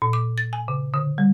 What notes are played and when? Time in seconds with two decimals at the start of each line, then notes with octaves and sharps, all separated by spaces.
0.02 A#2
0.13 D6
0.38 A6
0.53 G#5
0.68 C#3
0.94 D3
1.18 G3